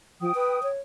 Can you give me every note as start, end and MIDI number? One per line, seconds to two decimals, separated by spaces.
0.21 0.32 53
0.21 0.68 79
0.21 0.68 87
0.35 0.62 71
0.63 0.80 73